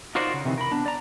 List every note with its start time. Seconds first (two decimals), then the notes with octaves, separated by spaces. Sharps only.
0.15 D#4 F4 F#4 A#4 C5 D5
0.34 C#3
0.45 C3 D#3 E3
0.58 A#4 B5
0.72 B3 D4
0.86 D5 A#5